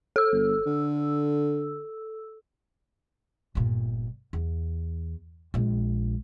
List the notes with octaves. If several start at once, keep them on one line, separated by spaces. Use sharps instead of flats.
A4 E6
G1
D3
G1 A#2
E2
A#1 G#3